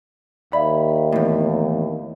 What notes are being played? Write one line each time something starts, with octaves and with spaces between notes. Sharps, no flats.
D#2 D5 E5 F5 B5
E2 A2